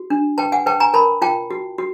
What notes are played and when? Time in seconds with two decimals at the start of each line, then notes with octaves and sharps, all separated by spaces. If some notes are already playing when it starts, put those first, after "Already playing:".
Already playing: F#4
0.10 D4
0.38 B4 G5 A5
0.52 F#5 G#5
0.66 B4 G5 A5
0.80 G#5 A#5
0.94 A#4 A5 B5
1.22 F4 G5 A5
1.51 F#4
1.78 F#4